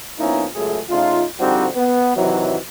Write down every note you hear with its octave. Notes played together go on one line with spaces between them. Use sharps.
F3 A#3 B3 C#4 D#4 E4
C#2 F#2 A3 G#4
C#3 A3 D#4 F4
D3 F3 G3 C4 D#4 F#4
B3
C3 D#3 E3 F#3